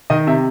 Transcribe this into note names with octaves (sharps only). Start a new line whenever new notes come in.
D#3 D#5
C3 E5